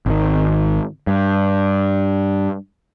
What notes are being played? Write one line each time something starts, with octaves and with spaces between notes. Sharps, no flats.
G#1 D#3
G2